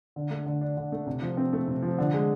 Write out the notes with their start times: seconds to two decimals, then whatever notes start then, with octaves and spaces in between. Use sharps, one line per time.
0.16 D3
0.31 A3
0.46 D3
0.61 D4
0.77 D3
0.92 A3
1.07 C3
1.22 F3
1.37 C4
1.53 A3
1.68 C3
1.83 F3
1.98 D3
2.13 G#3